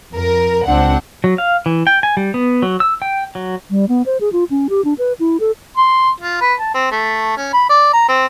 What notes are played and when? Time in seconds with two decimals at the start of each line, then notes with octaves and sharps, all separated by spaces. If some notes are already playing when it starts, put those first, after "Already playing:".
0.13 F2 A#4
0.67 C#2 C4 D4 F#5
1.24 F#3
1.38 F5
1.66 E3
1.87 G5
2.03 G#5
2.17 G3
2.34 B3
2.62 F#3
2.80 E6
3.02 G5
3.35 F#3
3.70 G3
3.89 B3
4.06 C5
4.21 G#4
4.32 F4
4.50 C#4
4.70 G4
4.85 D4
4.98 B4
5.20 E4
5.40 A4
5.77 C6
6.20 F4
6.41 B4
6.59 A5
6.74 C4
6.92 A3
7.37 C#4
7.53 B5
7.69 D5
7.93 A#5
8.09 C4